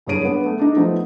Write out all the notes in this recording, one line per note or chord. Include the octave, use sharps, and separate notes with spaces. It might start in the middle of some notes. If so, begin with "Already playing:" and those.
F#1 G2 G#4 C#5 D7 D#7
B3 D4
A3
D4 D#4
F3 A3 B3 D#4